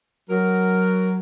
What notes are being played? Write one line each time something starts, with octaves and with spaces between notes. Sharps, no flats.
F#3 A#4